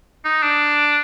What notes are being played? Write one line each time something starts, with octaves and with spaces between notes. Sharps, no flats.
D#4
D4